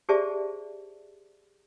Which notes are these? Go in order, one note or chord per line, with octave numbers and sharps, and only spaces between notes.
G4 G#4 C5 D5 E5 A5